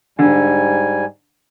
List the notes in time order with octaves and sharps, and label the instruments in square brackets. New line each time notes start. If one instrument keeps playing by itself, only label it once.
[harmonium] G#2 G3 G#5 [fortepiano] D3